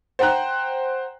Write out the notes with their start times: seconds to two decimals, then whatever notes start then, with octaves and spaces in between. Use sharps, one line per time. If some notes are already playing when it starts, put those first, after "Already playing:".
0.19 C5 F#5 G5 A#5 F#6